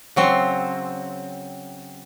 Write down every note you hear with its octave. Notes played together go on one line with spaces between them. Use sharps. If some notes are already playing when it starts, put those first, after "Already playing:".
C#3 F#3 C4